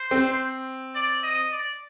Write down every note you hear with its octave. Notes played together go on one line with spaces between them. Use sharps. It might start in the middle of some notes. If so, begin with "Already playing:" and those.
Already playing: C5
C4
D5
D#5
D5